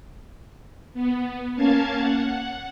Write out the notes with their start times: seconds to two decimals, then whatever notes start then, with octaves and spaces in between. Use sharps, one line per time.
0.94 B3
1.55 A#3 C#4 F5 A5 G#6
1.97 F#5